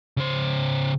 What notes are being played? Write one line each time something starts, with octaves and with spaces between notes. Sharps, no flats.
C#3 C5